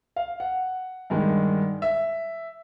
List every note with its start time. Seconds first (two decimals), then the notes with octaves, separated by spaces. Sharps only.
0.16 F5
0.40 F#5
1.10 G2 D#3 G#3
1.82 E5